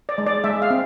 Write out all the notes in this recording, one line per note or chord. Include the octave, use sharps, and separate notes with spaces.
D5
G#3
D5
G#3 E5
F5
C4